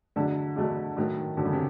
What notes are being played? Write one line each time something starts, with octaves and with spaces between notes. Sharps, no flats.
E2 B2 D3 F#3 A3 D4
E2 B2 F#3 A3 D4
A2 D#3 F#3 A3
D#3
A2 D3 F#3 A3
C#3
C3